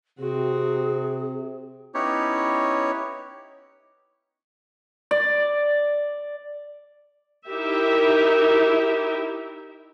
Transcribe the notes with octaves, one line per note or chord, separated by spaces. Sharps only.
C3 C4 F#4 G#4
B3 C#4 D#4 E4 G4 C#5
D5
D#4 E4 G4 A#4 E5